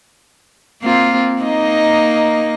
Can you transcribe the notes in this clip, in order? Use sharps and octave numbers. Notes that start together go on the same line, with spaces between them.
A#3 C4 F4
A#3 D#4 D#5